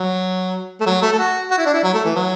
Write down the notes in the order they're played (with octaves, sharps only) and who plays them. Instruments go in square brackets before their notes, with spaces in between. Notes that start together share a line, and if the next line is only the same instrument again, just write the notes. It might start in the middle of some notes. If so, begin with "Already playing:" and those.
Already playing: [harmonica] F#3
A3
F#3
A3
A4
F#4
F#4
E4
D4
E4
F#3
A3
E3
F#3